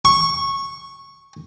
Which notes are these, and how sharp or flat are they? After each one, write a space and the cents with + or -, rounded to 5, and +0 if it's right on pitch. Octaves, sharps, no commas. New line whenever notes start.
C#6 -10